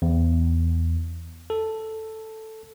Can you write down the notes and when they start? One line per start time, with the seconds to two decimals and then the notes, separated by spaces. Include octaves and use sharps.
0.02 E2
1.50 A4